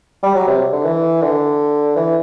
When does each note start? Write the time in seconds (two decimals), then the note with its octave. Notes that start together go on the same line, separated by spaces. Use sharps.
0.23 G3
0.35 F#3
0.47 C3
0.72 D3
0.85 E3
1.22 D3
1.96 E3